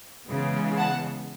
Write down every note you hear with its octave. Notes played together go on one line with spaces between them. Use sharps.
C#3 E3 G#3 B3
F#5 A5